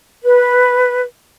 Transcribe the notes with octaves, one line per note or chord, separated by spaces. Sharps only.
B4